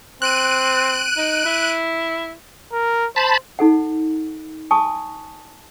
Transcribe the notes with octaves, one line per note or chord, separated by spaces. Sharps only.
C4 F#6 D7 D#7
D#4
E4
A#4
C5 A5 B5
D#4 A4 F#5
G#5 A5 C#6 D#6